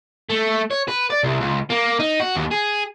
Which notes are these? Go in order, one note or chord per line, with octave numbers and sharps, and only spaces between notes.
A3
C#5
B4
D5
C2
C#2
A#3
D#4
F#4
D#2
G#4